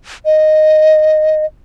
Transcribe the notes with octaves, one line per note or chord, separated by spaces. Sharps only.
D#5